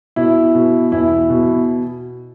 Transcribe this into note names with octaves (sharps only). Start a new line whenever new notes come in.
B2 E4
B2
E2 E4
B2